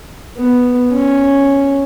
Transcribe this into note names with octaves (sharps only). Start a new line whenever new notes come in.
B3
C#4